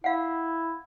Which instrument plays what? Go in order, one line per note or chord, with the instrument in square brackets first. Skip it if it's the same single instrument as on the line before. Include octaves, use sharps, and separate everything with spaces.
[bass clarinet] E4 [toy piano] F5 F#5